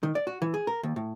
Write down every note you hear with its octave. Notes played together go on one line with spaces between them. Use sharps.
D#3
D5
F#4
E3
G#4
A#4
D#2
A2